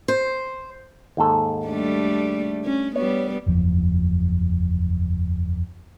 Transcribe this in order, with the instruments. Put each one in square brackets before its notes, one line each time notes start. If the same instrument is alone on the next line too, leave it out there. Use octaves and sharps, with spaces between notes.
[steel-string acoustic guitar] C5
[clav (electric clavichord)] D#2 G#2 A4
[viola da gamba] G3 A3 D4
C#4
[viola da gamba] G3 B3 [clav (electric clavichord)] C#5
[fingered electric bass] F#1 E2 F3